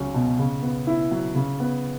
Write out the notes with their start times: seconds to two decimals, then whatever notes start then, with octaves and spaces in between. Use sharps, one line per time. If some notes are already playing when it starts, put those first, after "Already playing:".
Already playing: C#2 F#3 C#4
0.14 B2
0.39 C#3
0.63 B3
0.87 E4
1.11 F#3
1.35 C#3
1.60 B3